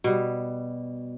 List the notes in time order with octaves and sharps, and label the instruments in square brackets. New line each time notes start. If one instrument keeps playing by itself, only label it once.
[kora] B2 G3